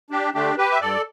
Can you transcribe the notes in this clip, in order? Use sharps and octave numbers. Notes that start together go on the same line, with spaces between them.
D4 G4
D3 A3 D4 G4
G4 B4
E5
G2 A4 D5